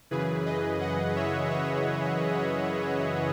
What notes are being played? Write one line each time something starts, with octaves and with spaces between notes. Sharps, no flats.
F#2 C#3 E3 G#4 B4
B4 D#5
D#5 F#5
C#5 E5
C#5 E5